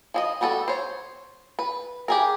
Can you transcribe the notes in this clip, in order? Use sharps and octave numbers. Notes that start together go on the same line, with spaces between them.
F3 G#4 D#5
G3 B3 F#4 A4
C5 C#5
B4
G4 G#4 A#4